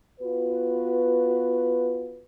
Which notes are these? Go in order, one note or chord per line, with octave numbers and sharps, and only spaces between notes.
B3 F4 F#4 B4